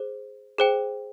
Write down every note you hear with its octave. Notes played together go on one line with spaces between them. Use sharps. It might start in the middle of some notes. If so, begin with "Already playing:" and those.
Already playing: G#4 C5
G#4 C5 G5